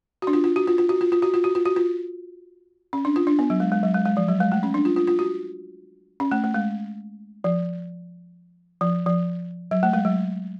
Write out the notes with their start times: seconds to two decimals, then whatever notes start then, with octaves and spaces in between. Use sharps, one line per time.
0.22 F#4
0.27 D4
0.33 F4
0.44 F4
0.56 F#4
0.68 F4
0.78 F4
0.89 F#4
1.01 F4
1.12 F4
1.22 F#4
1.34 F4
1.44 F#4
1.55 F4
1.65 F#4
1.76 F4
2.93 C#4
3.05 D4
3.16 F4
3.27 D4
3.39 B3
3.50 F#3
3.60 G#3
3.72 G#3
3.83 F#3
3.94 G#3
4.05 G#3
4.17 F3
4.28 F#3
4.40 G#3
4.52 A3
4.63 C#4
4.74 D4
4.85 F4
4.96 F4
5.07 F4
5.19 F#4
6.20 C#4
6.32 A3
6.44 A3
6.54 G#3
7.44 F3
8.81 F3
9.06 F3
9.71 F#3
9.83 A3
9.93 G#3
10.05 F#3